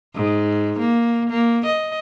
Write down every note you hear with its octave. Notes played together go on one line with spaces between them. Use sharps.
G#2
A#3
A#3
D#5